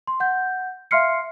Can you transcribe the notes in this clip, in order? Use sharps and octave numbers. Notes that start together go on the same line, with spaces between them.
C6
F#5 G6
E5 F5 C6 F6 C7 C#7